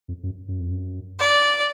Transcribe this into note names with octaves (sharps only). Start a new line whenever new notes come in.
F2
F#2
F#2
F2
F#2
D5